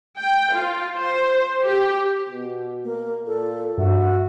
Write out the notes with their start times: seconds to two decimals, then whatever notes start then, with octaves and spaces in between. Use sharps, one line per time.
0.20 G5
0.54 F4
0.97 C5
1.64 G4
2.29 B2
2.84 A#3
3.26 A#2 A4
3.78 G2 F#4 E5